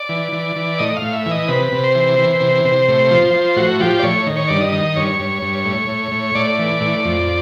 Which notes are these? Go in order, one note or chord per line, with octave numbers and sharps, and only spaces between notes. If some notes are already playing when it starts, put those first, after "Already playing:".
Already playing: D5
E3
E3
E3
A2 D#5
F5
A2
E5
E3
D#5
C3 B4
C3
C5
E3
E3
C3
C3
A2
F3
F3
A2 F#4
F3 G4
D5
A2 C#5
D#3
C#5
G2 D5
D#5
D#3
G2 C#5
G2
G2
A2
A2
A2
A2 D5
E3
A2
F2